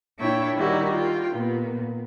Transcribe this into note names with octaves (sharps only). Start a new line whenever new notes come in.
A#2 D4 E4 C#5 E5 G5
D#3 G3 E4 F#4
F4 G5
A#2 B3